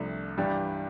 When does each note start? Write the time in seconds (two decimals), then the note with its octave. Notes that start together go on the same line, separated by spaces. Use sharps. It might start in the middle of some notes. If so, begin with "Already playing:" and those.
Already playing: C2 C3 F3 A3 D4
0.37 G2 E3 G3 D4 G4